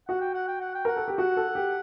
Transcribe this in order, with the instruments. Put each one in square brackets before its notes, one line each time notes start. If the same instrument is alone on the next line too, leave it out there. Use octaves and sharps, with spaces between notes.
[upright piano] F#4 [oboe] F#5
[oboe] G5
F#5
G5
F#5
G5
[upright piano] A#4 [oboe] F#5
[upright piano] A4
G4
[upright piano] F#4 [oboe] F#5
[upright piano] A4
G4